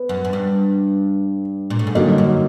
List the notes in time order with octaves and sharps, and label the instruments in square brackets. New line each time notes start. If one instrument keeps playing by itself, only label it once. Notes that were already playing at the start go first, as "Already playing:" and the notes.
Already playing: [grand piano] B3
[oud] F#2
F#2
G2
A#2
A2
G#2
[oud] G2 [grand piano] D3 F#3 A#3 D#4
[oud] F#2